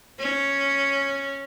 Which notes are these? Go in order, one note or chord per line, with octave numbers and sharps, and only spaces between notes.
C#4